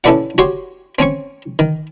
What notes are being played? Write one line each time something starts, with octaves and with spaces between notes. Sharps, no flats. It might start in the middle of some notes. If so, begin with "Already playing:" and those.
C#4 E4 A4 B4 D5 F#5
F#4 G4 C#5 C6
C4 C#4 G#5 C#6
D#3